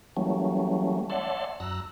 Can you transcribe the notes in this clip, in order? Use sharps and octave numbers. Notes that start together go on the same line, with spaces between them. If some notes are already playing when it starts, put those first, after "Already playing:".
E3 F#3 G3 A3 A#3 C#4
C#5 D5 E5 F#5 A5 C6
F#2 A#5 E6 F#6